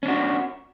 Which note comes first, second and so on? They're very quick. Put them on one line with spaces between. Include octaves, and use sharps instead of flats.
C#4 D4 F#4